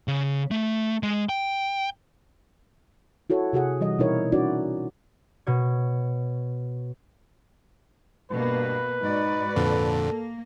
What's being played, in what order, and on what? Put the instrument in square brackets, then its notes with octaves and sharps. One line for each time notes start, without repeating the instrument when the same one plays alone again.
[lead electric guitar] C#3
A3
G#3
G5
[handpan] E4 F#4 A4 C#5
C3 F#4 G#4 F#5
E3 G3 D#5
B2 C4 D#4 E4 A#4 C#5
C#4 D#4 E4 F#4 D5
[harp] B2 C#5
[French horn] G2 [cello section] B2 A#3 [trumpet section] B4
[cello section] G#2 F#4 D5 [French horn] D#4
[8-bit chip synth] F2 A#2 D3 [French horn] A4
[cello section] A#3